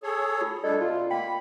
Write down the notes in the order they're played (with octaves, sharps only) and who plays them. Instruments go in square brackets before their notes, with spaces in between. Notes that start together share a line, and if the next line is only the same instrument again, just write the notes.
[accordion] G#4 A4 C#5
[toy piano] F4
[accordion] G3 A3 D4 [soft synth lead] A4 [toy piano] D5 D#5
[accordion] C3 [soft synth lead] F4
[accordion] A#3 [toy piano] G5 [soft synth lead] B5